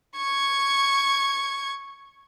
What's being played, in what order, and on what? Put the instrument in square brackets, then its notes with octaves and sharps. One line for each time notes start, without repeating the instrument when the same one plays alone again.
[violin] C#6 G#6